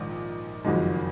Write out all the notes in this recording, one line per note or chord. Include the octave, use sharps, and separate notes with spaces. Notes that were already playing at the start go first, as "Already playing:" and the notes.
Already playing: A#1 G#2 D#3
F#1 F2 D#3 G#3